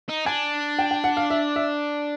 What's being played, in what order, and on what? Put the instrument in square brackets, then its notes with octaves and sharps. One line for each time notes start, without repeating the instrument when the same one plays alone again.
[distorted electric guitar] D#4
[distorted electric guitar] D4 [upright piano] G#5
[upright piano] G5
G5
F#5
F5
E5
E5